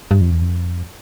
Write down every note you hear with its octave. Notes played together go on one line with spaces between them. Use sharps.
G2
F2
E2
F2